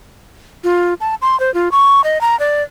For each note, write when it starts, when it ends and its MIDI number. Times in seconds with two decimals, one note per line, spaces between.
0.64 0.94 65
1.01 1.15 81
1.22 1.38 84
1.40 1.53 72
1.54 1.71 65
1.72 2.03 85
2.04 2.21 75
2.21 2.38 82
2.40 2.63 74